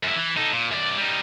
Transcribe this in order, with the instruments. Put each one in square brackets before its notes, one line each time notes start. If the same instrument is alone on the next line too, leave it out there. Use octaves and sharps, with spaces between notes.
[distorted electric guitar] F#2 E4
E3
D#4 A4
A#2
F#2 D5
G3 D#4